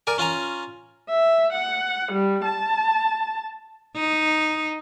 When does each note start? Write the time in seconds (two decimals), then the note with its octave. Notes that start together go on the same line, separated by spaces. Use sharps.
0.07 A#4 D5 G#5
0.18 C#4 F4 G#5 A#5
1.09 E5
1.53 F#5
2.12 G3
2.44 A5
3.96 D#4